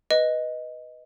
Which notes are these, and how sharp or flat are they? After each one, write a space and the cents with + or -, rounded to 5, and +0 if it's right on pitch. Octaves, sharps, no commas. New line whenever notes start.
B4 +0 D#5 +5